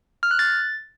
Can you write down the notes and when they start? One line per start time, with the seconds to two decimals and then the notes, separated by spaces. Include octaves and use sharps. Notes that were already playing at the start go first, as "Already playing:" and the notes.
0.23 F6
0.31 F#6
0.39 A6